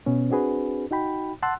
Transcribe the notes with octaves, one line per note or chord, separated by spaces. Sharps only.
B2 B3 C#4
C4 D4 F#4 G#4 B4
D#4 F#4 G5 B5
F#5 A5 C6 E6 F#6